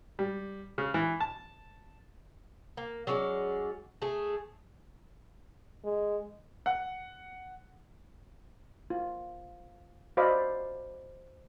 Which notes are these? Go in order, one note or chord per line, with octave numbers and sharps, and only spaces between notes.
G3
C#3
E3
A5
A#3
F#3 G#3 C#4 D5
A3 G#4
G#3
F#5
F4
F#4 C5 D5 D#5 F5 B5